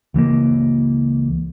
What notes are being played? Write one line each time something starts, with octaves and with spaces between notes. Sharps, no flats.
C#2 E3 A3 A#3